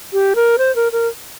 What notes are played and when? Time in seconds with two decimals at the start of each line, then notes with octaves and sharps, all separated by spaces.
0.13 G4
0.36 A#4
0.58 C5
0.76 A#4
0.92 A#4